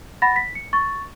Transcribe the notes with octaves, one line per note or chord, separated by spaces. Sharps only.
F#5 B5 A6 A#6
B6
C#7
C#6 A6